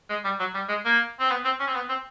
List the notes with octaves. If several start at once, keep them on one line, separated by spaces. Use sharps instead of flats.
G#3
G3
F#3
G3
G#3
A#3
C4
B3
C4
C#4
C4
B3
C4